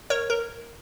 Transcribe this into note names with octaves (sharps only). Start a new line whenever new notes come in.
A#4 C#5
A#4